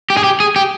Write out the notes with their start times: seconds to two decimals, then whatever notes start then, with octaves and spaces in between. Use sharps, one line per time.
0.10 G4
0.17 G#4
0.24 G4
0.40 G#4
0.56 G4